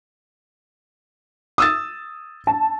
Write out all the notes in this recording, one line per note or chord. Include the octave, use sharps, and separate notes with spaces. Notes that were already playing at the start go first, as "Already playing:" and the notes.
D#6 E6 A6
A5